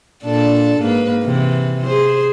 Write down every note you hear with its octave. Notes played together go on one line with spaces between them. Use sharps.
A#2 D4 A4
G#2 A#3 B4
C3 E3
G#4 C5